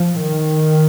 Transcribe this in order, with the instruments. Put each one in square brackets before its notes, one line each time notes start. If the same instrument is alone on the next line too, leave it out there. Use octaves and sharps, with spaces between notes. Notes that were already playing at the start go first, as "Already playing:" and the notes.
Already playing: [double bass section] F3
D#3